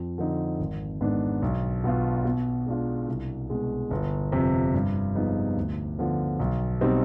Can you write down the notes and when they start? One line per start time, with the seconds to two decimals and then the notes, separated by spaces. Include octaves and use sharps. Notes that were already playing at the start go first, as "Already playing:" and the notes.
Already playing: F2
0.18 D3 F3 C4 D#4
0.59 G#1
1.01 G#2 D#3 B3 D4
1.42 B1
1.84 B2 B3 F4
2.25 B2
2.66 G#3 D4 F4
3.08 C2
3.50 B2 G#3
3.91 G1
4.32 F2 C3
4.74 G2
5.15 F3 G#3 B3 D#4
5.56 D2
5.98 D3 F3 B3
6.39 B1
6.81 B2 G3 C4 D#4